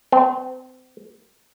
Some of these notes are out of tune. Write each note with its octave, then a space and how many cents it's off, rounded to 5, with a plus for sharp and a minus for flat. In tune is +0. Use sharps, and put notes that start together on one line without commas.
C4 -30